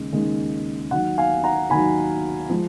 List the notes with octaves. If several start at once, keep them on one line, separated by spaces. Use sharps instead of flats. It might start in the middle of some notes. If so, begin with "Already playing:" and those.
Already playing: D#2 C#3 G#3
D#2 C#3 G#3
D#2 D#3 F#3 F#5
F5 G#5
F#5 A#5
D#2 D#3 F#3 G#5 B5
F3 G#3